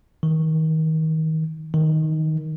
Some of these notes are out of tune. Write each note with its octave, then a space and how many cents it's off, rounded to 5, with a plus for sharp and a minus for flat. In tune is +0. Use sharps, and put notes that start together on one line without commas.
D#3 +30
D#3 +10